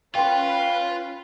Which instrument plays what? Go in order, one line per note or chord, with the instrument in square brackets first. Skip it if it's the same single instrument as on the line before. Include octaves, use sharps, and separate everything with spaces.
[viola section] C#4 B4 [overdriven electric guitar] F4 [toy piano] G5 C6